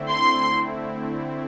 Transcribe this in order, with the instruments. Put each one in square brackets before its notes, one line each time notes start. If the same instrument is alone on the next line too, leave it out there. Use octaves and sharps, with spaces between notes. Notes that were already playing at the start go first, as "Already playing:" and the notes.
Already playing: [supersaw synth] D3 A3 C4 E4
[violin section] C6